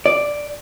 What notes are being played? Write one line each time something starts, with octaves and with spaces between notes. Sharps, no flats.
D5